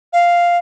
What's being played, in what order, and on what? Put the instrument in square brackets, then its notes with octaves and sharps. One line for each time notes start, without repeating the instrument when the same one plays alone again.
[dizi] F5